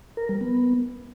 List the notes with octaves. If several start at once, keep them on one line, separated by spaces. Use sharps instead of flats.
A#4
G3
B3